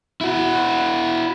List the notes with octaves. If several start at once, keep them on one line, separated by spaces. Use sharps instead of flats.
E4 F#4